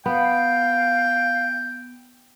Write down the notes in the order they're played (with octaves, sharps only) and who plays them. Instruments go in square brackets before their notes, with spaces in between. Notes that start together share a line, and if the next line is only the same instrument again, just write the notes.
[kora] B3 [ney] F5 [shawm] G5